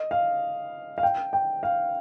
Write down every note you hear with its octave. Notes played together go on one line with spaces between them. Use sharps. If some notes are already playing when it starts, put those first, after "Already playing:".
Already playing: D#5
F5
F5
G5
G5
F5